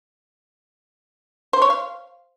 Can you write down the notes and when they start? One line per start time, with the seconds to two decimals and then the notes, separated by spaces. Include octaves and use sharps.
1.53 C5
1.62 C#5
1.70 F5